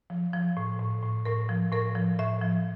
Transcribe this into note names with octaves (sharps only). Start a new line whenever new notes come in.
F3
F3
A2
A2
A2
A2 A#4
F3
A2 A#4
F3
A2 E5
F3